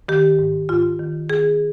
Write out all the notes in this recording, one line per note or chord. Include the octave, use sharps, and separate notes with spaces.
D#3 G4
G#2
G#2 F4
D#3
D#3 G#4